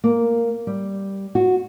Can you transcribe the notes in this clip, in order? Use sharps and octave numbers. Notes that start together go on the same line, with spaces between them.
A#3
G3
F#4